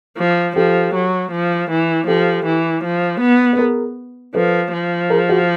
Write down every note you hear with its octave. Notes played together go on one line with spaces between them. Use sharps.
F3
F3 G4 A4
F#3
F3
E3
F3 G4 A4
E3
F3
B3
B4
G#4 A#4
F3 A4 B4
F3
G#4 A#4
F#4 G#4